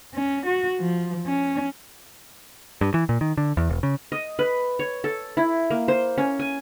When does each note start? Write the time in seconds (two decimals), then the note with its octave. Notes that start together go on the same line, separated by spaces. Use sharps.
0.14 C#4
0.46 F#4
0.79 F3
1.27 C#4
2.81 G2
2.94 E3
3.09 A#2
3.21 D#3
3.37 D3
3.57 E2
3.69 E1
3.83 C#3
4.12 D#5
4.39 B4
4.79 C#5
5.04 A4
5.37 E4
5.71 A#3
5.88 C5
6.18 C#4
6.39 G#5